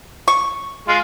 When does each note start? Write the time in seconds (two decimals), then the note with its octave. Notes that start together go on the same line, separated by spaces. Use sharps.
0.28 C#6
0.88 G#3 F4